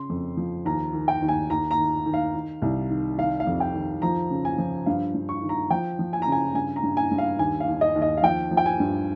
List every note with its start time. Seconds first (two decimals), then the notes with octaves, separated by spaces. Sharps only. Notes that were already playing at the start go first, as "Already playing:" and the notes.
Already playing: C#3 C6
0.10 F2
0.37 F3
0.65 D#2 A#5
0.93 D#3
1.08 G5
1.22 D#2
1.28 G#5
1.50 D#2 A#5
1.71 A#5
1.78 D#3
2.06 D#3
2.14 F5
2.34 D#3
2.62 C2
2.90 D#3
3.18 D#3 F5
3.40 F5
3.47 F2
3.60 G5
3.74 D#3
4.02 F3 A#5
4.30 C#3
4.45 G#5
4.58 F3
4.86 G2 F5
5.14 G2
5.29 C#6
5.42 D#3
5.49 A#5
5.70 F3 G5
5.99 F3
6.13 G#5
6.22 A#5
6.27 C#3 G#5
6.54 G2 G#5
6.76 A#5
6.83 G2
6.97 G#5
7.11 G2
7.18 F5
7.39 D#2 G#5
7.60 F5
7.67 D#2
7.81 D#5
7.96 D#2
8.02 D#5
8.17 F5
8.23 F3 G5
8.51 F3
8.57 G5
8.66 G#5
8.80 G2